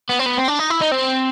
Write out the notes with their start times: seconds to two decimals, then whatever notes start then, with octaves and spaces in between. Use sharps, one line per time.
0.09 B3
0.19 C4
0.26 B3
0.37 C4
0.48 D4
0.59 D#4
0.70 E4
0.81 D#4
0.92 C4